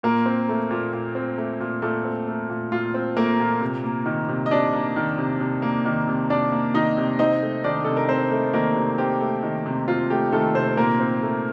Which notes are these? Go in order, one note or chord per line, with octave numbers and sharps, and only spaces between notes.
A#2 A#3 A#4
C4
A3
A#2
A#2
C4
A3
A#2
A#2 A3 A4
C4
A3
A#2
A#2 F4
C4
A3 A#3 A#4
A#2
C3
A#3
D#3
C3
D#5
C3 D4 D5
A#3
D#3
C3
C3
A#3
D#3
C3
C3 D4 D5
A#3
D#3 D#4 D#5
C3
C4 D#4 D#5
A3
D#3 D4 D5
C3 A4
A#4
C4 C5
A3
D#3 A#3 A#4
C3
C4 G4
A3
D#3
C3
C4 F4
A3 G4
D#3 A3 A4
C3 C4 C5
A#2 A#3 A#4
C4
A3